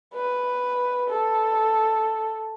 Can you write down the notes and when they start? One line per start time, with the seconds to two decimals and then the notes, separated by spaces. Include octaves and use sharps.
0.14 B4
1.10 A4